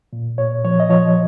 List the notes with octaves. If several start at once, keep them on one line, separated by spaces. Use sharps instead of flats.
A#2
A#2 C#5
F3 C#5
D#5
F3 C#5